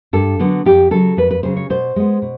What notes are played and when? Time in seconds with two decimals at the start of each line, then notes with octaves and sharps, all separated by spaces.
0.13 G2 A4
0.39 D3 F#3 B3
0.65 F2 G4
0.91 C#3 F#3 A4
1.17 F2 B4
1.31 B4
1.43 C#3 F#3 C5
1.57 C#5
1.70 B2 C5
1.96 G#3 B3
2.22 B2